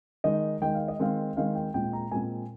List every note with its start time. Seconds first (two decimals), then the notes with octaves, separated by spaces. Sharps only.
0.24 D#3 G#3 D#4 D#5
0.61 D#3 G#3 D#4 G5
0.75 F5
0.88 D#5
0.99 D#3 G#3 C4 D#4 F5
1.36 D#3 G#3 C4 D#4 F5
1.55 G5
1.74 A#2 G#3 C4 G5
1.93 A#5
2.12 A#2 G#3 C4 G#5